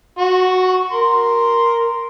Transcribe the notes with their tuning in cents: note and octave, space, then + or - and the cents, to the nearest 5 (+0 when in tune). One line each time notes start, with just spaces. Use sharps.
F#4 +0 C#6 -30
A#4 +0 C6 +0